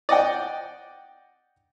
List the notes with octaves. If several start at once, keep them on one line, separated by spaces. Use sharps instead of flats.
D5 D#5 F#5 G5